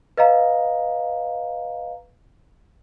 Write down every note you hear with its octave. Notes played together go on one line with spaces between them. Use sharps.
B4 D#5 F5 A#5